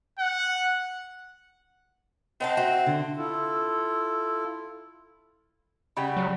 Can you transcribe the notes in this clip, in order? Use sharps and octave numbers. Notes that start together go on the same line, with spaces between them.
F#5
C4 D#4 F#5 A5
F#4 E5
D3
E4 F4 A4
C#3 G3 F#5 G5 B5
F#3